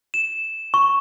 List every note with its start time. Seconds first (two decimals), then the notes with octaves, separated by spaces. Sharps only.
0.14 E7
0.74 C#6